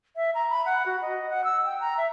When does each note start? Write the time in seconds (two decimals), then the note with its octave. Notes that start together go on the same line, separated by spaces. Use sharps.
0.16 E5
0.35 A#5
0.50 B5
0.66 F#5
0.86 F#4
1.02 D#5
1.29 F#5
1.44 E6
1.65 G5
1.81 A#5
1.97 E5